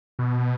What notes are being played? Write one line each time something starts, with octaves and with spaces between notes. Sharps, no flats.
B2